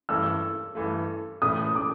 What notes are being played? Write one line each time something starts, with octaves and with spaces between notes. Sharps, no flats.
G2 E3 A3 E6
G2 E3 A3
A2 E3 A3 D#6
D6